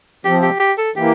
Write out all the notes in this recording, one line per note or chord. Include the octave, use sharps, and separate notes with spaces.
C3 F3 C4 G4
G4
G4
A4
E3 A#3 G4